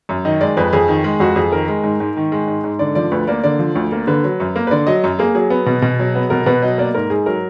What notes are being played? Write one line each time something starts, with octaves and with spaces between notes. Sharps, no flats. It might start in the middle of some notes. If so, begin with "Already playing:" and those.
F#2
D#3 D#5
G#3 D5
F2 B4
F2 G#4
D#3
G#3
F2 F#4
F2 G#4
D#3 A#4
G#3
G#2
G#2
D#3
G#3
G#2
G#2
D3 D5
F3 D5
D2 B4
A#3 D5
D3 D5
F3
D2
A#3
D3 B4
F#3
F#2
A#3
B4
D3 D5
F#3 D#5
F#2
A#3 G#4
F#3 G#4
B3
B2
B2
F#3
B3
B2 A#4
B2 B4
F#3 D#5
A#3 D5
G#2 A#4
G#2 G#4
F#3 A#4